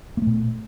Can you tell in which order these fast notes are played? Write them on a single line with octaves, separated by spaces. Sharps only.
A#3 A3 A#2